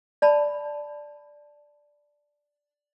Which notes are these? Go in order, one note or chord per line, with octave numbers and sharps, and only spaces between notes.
D5 A5 B5